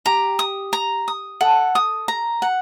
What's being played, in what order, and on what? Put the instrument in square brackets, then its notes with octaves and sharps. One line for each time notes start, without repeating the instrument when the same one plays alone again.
[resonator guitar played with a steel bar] G4 [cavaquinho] A#5
[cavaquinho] D#6
A#5
D#6
[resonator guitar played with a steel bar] A4 [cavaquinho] F#5
[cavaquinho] D#6
A#5
F#5